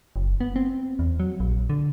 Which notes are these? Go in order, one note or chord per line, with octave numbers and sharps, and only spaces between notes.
F#1
B3
C4
E2
F#3
A#1
D3